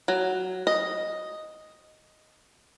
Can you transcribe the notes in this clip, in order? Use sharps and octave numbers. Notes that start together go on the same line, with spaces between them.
F#3
D#5